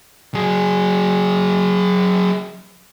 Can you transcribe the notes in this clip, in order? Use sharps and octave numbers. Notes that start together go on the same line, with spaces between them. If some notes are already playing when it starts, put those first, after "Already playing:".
F#3 G#4